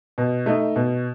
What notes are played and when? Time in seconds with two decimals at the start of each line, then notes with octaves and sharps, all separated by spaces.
0.18 B2
0.46 A3 D#4
0.76 B2